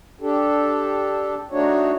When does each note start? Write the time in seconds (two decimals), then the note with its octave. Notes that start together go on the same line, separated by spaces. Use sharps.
0.21 D4 G4 A4
1.51 A3 D4 D#4 F#4 C#5